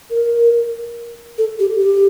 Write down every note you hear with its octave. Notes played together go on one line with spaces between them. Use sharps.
A#4
A4
G4
G4